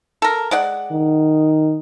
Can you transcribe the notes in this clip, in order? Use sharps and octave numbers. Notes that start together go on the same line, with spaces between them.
A4 A#4
G#3 D5 F#5
D#3